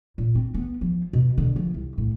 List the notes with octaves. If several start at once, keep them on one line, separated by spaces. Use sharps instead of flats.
A#2
C4
B3
F3
B2
D3
F3
C2
A2